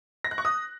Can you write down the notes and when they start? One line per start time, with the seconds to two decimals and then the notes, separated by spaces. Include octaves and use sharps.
0.24 A#6
0.31 F#6
0.38 C#6
0.45 D#6